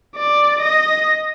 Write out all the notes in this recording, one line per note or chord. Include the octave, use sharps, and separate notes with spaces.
D5
D#5